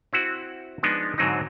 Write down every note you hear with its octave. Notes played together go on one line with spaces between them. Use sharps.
C4 E4 F#4
F3 G#3 B3 D4 D#4
G#2 D3 F#3 C4 D#4